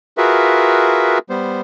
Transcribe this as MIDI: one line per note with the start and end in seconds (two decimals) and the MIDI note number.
0.18 1.18 65
0.18 1.18 66
0.18 1.18 68
0.18 1.18 70
0.18 1.18 71
0.18 1.18 76
1.30 1.61 55
1.30 1.61 59
1.30 1.61 72